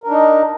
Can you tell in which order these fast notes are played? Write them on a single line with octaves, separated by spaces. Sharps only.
A#4 D4 D#4 D#5